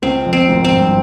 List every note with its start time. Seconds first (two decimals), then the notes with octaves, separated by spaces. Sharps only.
0.02 C#2 C#3 C4
0.26 F2
0.33 C4
0.49 G#1 G#2
0.64 C4
0.73 G2